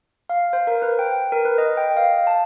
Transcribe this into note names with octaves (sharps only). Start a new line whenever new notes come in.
F5
C5
A#4
B4
G5
A#4
B4
D#5
G5
F5
A5